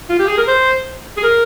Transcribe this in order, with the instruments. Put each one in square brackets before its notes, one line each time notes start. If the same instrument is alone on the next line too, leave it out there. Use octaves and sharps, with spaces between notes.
[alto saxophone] F4
G4
G#4
A#4
C5
G#4
A#4